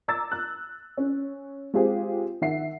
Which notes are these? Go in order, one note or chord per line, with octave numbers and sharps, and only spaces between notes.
A#5 D6 E6 A6
F#6
C#4
G#3 C4 F4 G4 G#4
D#3 E5 F#5 C7